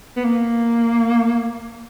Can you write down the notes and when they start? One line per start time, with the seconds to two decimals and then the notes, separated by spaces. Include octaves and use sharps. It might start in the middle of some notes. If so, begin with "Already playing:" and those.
0.17 B3
0.24 A#3